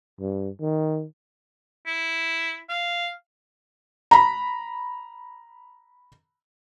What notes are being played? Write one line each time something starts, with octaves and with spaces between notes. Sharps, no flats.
G2
D#3
E4
F5
A#5 B5